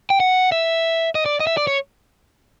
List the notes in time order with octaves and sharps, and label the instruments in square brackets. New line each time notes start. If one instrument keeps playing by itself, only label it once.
[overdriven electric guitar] G5
F#5
E5
D#5
D5
D#5
E5
D5
C#5